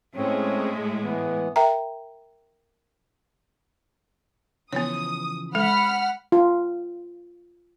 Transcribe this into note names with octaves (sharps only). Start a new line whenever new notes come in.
A2 G#3 C4 C#4 C#5
E3 B3
A#4 E5 G5 A#5
C#3 E3 F3 B3 C#5 D#6
G#3 A4 F#5 B5 F6
F4